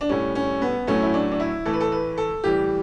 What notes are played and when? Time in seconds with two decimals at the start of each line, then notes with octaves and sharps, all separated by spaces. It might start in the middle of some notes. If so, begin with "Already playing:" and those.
0.01 D4
0.09 A2 G3 C#4
0.35 C#4
0.62 B3
0.87 A2 F#3 A3 C#4
1.02 E4
1.14 D4
1.31 D4
1.40 E4
1.66 A2 E3 A3 A4
1.73 B4
1.81 A4
1.92 B4
2.18 A4
2.44 A2 E3 G3 G4